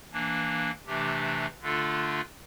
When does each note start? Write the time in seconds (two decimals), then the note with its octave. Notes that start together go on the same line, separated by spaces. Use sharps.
0.11 E3 A#3 D4
0.86 C3 E3 A3 D4 G4
1.61 D3 A3 D4 F4 A4